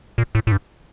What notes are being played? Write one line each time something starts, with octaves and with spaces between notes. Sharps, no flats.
A#2
A2
A2
G2